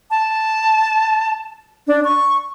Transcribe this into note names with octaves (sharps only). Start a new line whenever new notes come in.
A5
D4
C#6